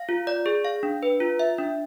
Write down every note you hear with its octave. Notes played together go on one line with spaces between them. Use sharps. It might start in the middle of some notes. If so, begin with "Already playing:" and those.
Already playing: F5
F4
D5
G#4
F5
D4
B4
F4
E5
D4